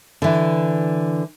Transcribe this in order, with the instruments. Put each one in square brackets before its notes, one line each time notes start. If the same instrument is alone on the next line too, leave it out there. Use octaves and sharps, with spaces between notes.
[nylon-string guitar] D3 E3